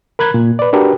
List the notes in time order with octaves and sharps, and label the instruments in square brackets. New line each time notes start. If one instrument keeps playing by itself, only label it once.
[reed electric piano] A#4 B5 F#6 G#6
A#2
B4 D5
D4 F#4 G4 A#4 B4